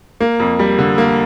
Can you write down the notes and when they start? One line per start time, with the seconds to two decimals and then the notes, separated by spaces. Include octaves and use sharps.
0.21 A#3
0.40 F2
0.59 G3
0.79 D3
0.98 A#3